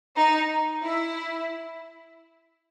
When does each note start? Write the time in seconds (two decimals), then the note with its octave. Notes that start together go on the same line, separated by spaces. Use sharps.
0.16 D#4
0.83 E4